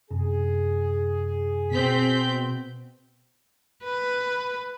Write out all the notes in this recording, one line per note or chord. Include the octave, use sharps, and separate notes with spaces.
F#2 C3 G#4
B2 C4 G6 B6
B4